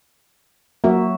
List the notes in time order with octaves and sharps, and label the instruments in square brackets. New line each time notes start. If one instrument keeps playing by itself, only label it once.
[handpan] F#3 F#4 E5 [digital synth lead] A#3